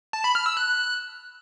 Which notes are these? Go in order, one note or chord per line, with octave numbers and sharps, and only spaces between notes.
A5
B5
F6
E6
F#6